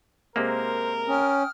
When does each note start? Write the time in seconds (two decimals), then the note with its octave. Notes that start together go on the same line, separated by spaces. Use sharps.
0.36 C3 G#3 A#3 A#4 C5
1.08 C#4 G5 D#6 F6